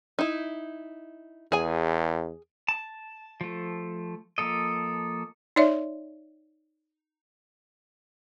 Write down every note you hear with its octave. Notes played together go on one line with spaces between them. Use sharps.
D#4 E4
E2 G#4 G#5
A5
F3 A3
F3 A#3 A4 D#5
D#4 C#5 D5 E5